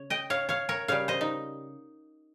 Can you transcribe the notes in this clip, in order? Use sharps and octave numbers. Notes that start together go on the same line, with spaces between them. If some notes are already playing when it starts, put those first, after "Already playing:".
Already playing: C#3 C#5
D#5 G5
C#5 F5
C#5 F5
A#4 C#5
C#3 G3 C#5 F5
C5 D#5
D#4